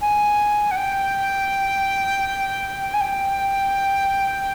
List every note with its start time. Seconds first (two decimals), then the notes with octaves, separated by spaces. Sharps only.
0.01 G#5
0.71 F#5
0.76 G5
2.93 G#5
3.00 G5